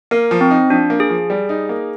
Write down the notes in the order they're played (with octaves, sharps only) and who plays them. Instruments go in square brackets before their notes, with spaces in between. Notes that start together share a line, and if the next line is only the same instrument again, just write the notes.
[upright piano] A#3 [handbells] A#4
[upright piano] F3
[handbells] C4
[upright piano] D#4
[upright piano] F3 [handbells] D4
[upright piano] A#3
[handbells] G#4
[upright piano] F3
G3
D#4
A#3